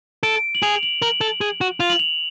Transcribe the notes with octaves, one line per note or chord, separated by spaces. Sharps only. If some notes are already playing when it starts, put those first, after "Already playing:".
A4 D7
F#7
G#4 F7
F#7
A#4 F#7
A4
G#4
F#4
F4 F7
F#7
F7